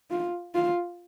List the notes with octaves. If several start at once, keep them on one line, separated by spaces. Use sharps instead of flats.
F4
F4